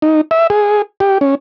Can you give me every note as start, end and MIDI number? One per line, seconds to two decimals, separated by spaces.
0.02 0.21 63
0.31 0.47 76
0.50 0.82 68
1.00 1.18 67
1.21 1.35 61